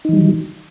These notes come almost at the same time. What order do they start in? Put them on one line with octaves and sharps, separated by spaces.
D#4 E3 G3 F#3 D#3